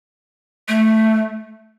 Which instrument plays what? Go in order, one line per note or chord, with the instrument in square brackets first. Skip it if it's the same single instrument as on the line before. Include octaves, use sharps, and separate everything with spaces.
[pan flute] A3